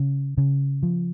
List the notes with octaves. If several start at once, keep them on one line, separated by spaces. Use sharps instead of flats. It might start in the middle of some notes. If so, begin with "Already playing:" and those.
Already playing: C#3
C#3
F3